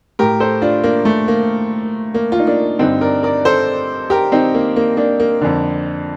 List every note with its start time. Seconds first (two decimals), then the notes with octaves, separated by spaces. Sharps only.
0.19 A2 G4 A#4
0.40 A4 C5
0.62 D4 F4
0.83 A#3 D4
1.05 A3
1.28 A#3
2.14 A#3
2.32 F4
2.39 D#4
2.47 A#3 D4
2.79 G2 D3 C4 D#4
3.01 A#4 D5
3.23 A#4 D5
3.45 A4 C5
4.10 G4 A#4
4.32 C4 D#4
4.54 A#3
4.76 A#3
4.97 A#3 D4
5.20 A#3
5.41 F2 D3